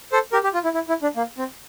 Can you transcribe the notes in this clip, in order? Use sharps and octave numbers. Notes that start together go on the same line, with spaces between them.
A4 C5
G4 A#4
G4
F4
E4
E4
E4
D4
A#3
C4